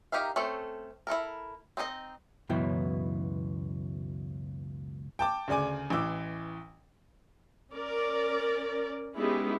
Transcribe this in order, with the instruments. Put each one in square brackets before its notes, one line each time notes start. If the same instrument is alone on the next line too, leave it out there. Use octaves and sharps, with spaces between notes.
[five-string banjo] D#4 G4 A#4 E5 F5
A3 C4 C#4 A4 C5
E4 F4 A4 A#4
C4 D#4 E4 D#5
[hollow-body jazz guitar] C#2 F#2 B2 E3 E4 G5
[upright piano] G5 A5 D6
D2 C#3 D5 G#5 D6
A1 E3 D6 E6
[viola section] C#4 A#4 D5
G#3 B3 C#4 D#4 E4 G4